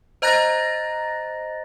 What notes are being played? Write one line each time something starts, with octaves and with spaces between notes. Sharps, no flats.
C5 D#5 A#5 F#6 A6 A#6